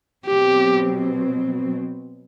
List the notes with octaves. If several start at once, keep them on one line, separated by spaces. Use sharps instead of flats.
B2 F#3 C4 G4